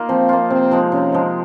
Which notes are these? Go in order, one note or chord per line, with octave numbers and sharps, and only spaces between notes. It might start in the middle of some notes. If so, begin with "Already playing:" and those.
Already playing: A#3 D#4 F4
F3 C4
A#3 F4
C3 C4
F3 G#3 D#4
C3 C#4
F3 G#3 D#4